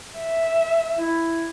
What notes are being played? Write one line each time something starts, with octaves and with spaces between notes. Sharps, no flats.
E5
E4